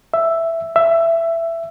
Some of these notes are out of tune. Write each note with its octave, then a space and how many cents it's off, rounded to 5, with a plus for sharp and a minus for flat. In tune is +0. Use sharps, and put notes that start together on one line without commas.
E5 +5
E5 +15